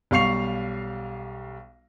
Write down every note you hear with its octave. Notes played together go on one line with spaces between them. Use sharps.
B1 G3 F5 C#6 C7 F7